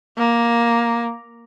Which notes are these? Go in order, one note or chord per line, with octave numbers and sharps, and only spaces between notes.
A#3